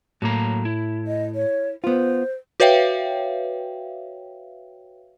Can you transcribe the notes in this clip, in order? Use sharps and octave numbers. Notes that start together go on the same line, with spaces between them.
A2 F#3 A#3 A#5
E4
D#5
C#5
B3 F4 C5
F#4 B4 C#5 E5 F5 G5